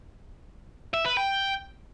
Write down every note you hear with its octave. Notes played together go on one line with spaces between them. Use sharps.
E5
B4
G5